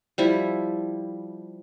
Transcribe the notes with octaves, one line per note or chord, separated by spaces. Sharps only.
F3 G3 E4